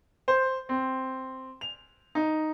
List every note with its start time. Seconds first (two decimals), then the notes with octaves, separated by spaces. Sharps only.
0.28 C5
0.69 C4
1.61 F7
2.15 D#4